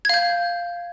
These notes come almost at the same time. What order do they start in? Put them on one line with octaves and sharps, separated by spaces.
G#6 F5 G6